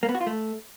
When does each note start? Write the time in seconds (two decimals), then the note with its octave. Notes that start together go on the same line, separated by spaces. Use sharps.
0.03 A#3
0.09 B3
0.15 F#4
0.21 F4
0.27 A3